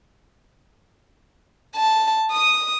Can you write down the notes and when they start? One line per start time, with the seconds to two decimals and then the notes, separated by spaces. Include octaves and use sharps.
1.76 A5
2.32 D#6 D#7